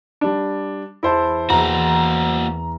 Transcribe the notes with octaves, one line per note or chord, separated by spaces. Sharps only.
G3 D4
E2 E4 C5 A5
E2 E3 A#3 F#4 A#5